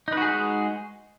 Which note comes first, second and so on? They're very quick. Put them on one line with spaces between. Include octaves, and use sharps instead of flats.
D#4 B4 F#4 G#4 G#3